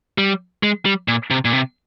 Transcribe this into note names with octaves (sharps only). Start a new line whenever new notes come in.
G3
G#3
G3
A#2
C3
A#2
C3